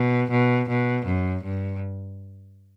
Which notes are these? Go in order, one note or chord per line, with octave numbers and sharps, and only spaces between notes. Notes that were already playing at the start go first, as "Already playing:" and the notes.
Already playing: B2
B2
B2
F#2
G2